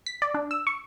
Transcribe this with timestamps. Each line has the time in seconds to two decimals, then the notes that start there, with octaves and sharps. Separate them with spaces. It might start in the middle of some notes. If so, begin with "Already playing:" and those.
0.06 B6
0.22 D5
0.34 D4
0.51 E6
0.67 C#6